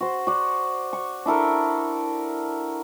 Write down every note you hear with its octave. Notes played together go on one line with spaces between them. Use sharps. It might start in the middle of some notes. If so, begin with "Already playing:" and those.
F#4 C5
F#4 D5
C#6
D4 E4 A4 A#4